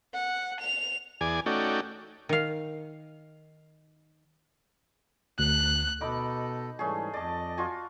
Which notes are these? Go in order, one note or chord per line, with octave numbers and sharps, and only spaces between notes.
F#5
F7
E2 G#4 D5 G#5
A3 C#4 D#4 F#4 D5 G5
D#3 F5
D2 F#6
B2 D#4 A4 B5 D6
G#2 E3 G3 A3 C#4 G#4
F2 D5 D#5 A5
F4 F#4 G#5